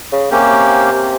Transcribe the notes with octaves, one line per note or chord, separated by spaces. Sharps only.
C#3
C3 A#3 C#4 G4